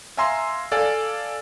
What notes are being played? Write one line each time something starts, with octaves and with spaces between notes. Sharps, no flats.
E5 F5 G#5 A#5 C6 E6
A4 D5 F5 G#5